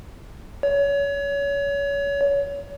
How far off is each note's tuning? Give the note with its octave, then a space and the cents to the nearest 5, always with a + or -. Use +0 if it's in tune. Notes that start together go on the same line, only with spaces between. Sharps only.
C#5 +30